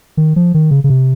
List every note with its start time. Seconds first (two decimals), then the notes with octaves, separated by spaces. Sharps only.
0.17 D#3
0.36 F3
0.54 D#3
0.71 C#3
0.84 C#3
0.90 C3